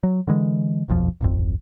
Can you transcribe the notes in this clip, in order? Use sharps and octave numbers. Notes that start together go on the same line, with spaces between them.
F#3
D3 E3 G#3
D#1 B1 F2 F3
D1 G#1 F2